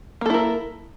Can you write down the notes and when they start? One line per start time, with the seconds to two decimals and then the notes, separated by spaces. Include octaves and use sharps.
0.21 A#3
0.26 A4
0.30 E4
0.34 A#4